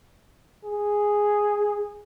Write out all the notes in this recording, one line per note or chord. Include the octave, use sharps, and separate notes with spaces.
G#4